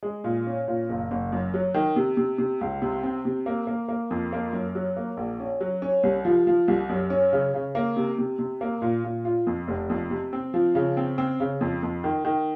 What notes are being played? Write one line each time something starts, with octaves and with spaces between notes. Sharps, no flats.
G#3
A#2
C#4
A#2
F#1
F#1
F#2
F#3
D#3
C3
C3
C3
C#2
C3
C4
C3
A#3
A#3
A#3
F2
A#3
F#2
F#3
A#3
A#1
C#4
F#3
C#4
C2
F3
F3
C2
F#2
C#4
C#3
C#3
A#3
C3
C3
C3
A#3
A#2
A#2
F4
F2
F1
F2
C3
C4
F3
C#3
C4
C4
C#3
F2
F2
D#3
D#3